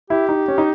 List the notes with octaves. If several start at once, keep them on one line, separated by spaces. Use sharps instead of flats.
E4 G4
D#4
C#4
D#4